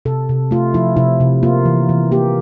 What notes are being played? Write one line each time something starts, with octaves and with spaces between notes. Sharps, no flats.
C3 A4
C3
A3 F4
F3 E4
C3 E4
C3
A#3 F4
E3
E3
A#3 G4